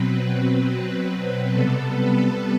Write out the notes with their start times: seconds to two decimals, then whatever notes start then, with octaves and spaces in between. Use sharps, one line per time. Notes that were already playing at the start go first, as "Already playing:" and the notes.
Already playing: B2 F#3 C4 B4
1.52 C3 G3 B3 A4
1.93 B4